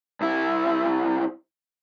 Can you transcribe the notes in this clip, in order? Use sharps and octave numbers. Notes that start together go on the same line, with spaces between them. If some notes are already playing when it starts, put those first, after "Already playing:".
C2 E4